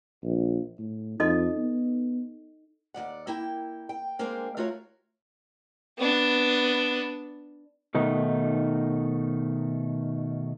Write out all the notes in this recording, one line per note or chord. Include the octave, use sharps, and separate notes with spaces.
A#1
A2
F2 D#4 A4 D#5
B3
D#2 E3 D5 F#5
A#3 E4 G5
G5
G#3 A#3 D4 C5 G5 G#5
A3 F4 F#4 A#4 C#5
B3 D4
B2 D#3 A3 D#4